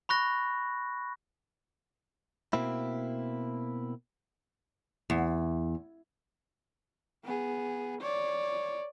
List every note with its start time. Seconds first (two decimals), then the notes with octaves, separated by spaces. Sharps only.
0.09 B5 C#6 F#6 A#6
2.53 B2 A#3 C4 E4
5.10 E2
7.25 B3 G#4
8.01 C#5 D5